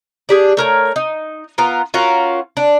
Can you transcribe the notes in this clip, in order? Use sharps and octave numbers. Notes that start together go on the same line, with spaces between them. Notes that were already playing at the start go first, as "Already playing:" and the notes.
D4 G4 G#4
A3 A#4 C#5
D#4
B3 F4 A#4
C#4 F4 F#4 A#4
D4